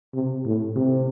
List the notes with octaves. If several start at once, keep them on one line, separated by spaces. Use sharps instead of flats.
C3
A2
C3